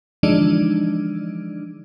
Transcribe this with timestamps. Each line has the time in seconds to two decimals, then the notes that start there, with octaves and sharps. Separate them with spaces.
0.23 D3 E3 F3 G#3 D4 D#4